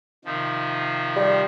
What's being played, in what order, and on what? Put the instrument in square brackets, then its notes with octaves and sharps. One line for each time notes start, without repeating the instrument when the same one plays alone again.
[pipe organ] C3 D#3 F3
[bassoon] G3